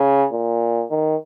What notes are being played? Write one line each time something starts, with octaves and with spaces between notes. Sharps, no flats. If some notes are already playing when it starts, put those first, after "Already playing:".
Already playing: C#3
A#2
D#3